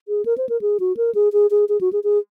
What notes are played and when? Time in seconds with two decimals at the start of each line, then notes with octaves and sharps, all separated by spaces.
0.08 G#4
0.26 A#4
0.38 C5
0.49 A#4
0.61 G#4
0.80 F#4
0.97 A#4
1.15 G#4
1.33 G#4
1.51 G#4
1.69 G#4
1.81 F#4
1.93 G#4
2.04 G#4